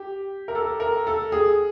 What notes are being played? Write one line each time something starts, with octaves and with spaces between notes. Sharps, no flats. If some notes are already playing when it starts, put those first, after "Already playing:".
Already playing: G4
A#4
A4
A#4
A4
G#4